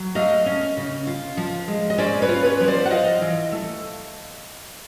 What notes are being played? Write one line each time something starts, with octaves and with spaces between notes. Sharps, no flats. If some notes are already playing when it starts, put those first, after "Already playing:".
Already playing: F#3
A3 D#5 F5
C#4
C#3
F4
F3
G#3
D#5
C#4 C5 D5
B4 C#5
F4
B4 C#5
F3 C#5
C5 D5
F#5
F4 D#5 F5
E3
A3